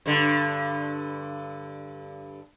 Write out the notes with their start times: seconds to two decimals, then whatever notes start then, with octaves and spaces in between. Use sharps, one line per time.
0.06 G2 D3